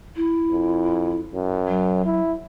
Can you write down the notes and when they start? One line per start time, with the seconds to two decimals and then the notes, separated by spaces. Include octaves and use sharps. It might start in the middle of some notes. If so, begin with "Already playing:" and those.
0.16 E4
0.51 F2
1.33 F#2
1.67 F#3
2.06 E4